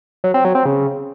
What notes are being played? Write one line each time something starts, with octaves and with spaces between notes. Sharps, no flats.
F#3
C4
F#3
C4
C#3